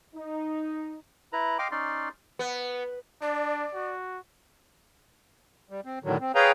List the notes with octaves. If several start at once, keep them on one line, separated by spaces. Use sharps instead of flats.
D#4
E4 B4 A#5
D#5 F5 G5 C6 D6
C#4 D#4 D5 C6
B3
D4 D5
F#4
G3
C4
A2 D3 D#3 F#3
C4
G#4 B4 C#5 F5 G5 A#5